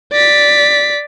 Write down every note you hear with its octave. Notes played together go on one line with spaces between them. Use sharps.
D5 B6